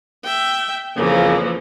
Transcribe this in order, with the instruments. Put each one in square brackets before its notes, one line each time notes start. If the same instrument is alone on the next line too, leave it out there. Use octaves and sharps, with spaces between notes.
[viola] E5 G5
[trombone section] F2 C#3 A#3 [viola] E3 F3